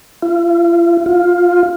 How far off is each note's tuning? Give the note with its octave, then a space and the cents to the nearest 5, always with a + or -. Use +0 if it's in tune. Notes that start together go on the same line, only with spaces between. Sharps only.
F4 -40
F4 +10